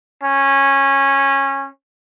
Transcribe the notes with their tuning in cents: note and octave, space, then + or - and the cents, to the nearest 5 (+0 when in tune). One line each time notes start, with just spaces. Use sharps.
C#4 -15